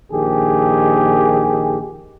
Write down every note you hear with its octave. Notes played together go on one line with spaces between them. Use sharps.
A#1 D#3 G4 G#4